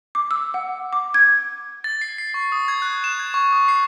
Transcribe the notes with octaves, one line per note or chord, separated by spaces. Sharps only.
D6
E6
F#5
D6
G#6
A6
C7
C7
C#6
D#6
G#6
F#6
E7
G#6
C#6
D#6
C7